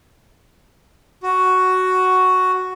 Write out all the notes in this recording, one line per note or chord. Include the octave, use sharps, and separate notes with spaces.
F#4